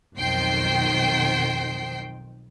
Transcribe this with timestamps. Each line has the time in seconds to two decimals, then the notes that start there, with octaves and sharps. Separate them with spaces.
0.16 B1 F2 D#3 C5 G5 C7